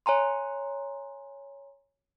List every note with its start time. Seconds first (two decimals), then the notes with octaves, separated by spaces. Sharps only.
0.06 C#5 G#5 A#5 C6